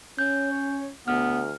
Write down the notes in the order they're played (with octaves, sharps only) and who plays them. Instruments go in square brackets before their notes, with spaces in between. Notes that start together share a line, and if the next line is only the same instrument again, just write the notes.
[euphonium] C#4 [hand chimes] G6
[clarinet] C#5
[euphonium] D2 [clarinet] B3 [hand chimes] F6